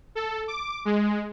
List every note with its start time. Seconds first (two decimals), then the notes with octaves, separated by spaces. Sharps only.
0.15 A4
0.48 D6
0.85 G#3